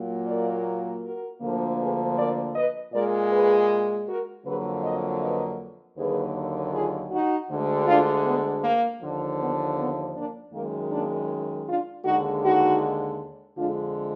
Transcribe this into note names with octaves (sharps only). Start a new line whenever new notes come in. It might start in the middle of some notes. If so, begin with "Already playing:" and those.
Already playing: A#2 F#3 A#3
A#4 D5
F#4 A#4
D2 D3 F3 A#3
G#4 B4
A#4 D5
B4 D#5
A#2 G#3 A#4 D5
G#4 B4
F#4 A#4
F2 D3 F#3 A#3 G#4 B4
B4 D#5
B4 D#5
D#2 D3 F#3 A#3 G#4 B4
F4 G#4
D#4 F#4
D2 D3 G#3
D4 F4
B3
A#3
D#2 D3 F3
B3
B3
A#3 D4
F#2 D#3 G#3 A#3
A#3 D4
D4 F4
D#2 D3 G#3 D#4 F#4
D#4 F#4
F2 D3 G#3 D4 F4